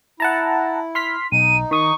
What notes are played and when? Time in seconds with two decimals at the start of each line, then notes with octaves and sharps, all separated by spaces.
0.20 E4 F#5 A5 A#5
0.95 C6 F6 B6
1.32 B1 D#4 D#7
1.71 D#3 C#6 D#6